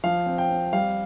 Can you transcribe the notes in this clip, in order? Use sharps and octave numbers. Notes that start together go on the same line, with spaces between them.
F3 F5
C4
G5
C4
G3 F5